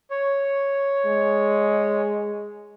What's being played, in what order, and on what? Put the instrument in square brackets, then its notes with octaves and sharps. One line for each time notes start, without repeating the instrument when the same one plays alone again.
[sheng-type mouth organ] C#5
[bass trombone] G#3